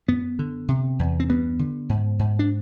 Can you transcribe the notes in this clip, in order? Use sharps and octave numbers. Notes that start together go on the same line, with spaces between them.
F#2 B3
D3
C3
E2
C4
G2 B3
D3
G#2
G#2
D4